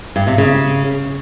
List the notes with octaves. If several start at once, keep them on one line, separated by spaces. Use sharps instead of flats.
G2
C3
C#3